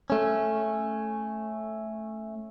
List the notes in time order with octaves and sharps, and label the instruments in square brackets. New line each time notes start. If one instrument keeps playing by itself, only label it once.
[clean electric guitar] A3 C#4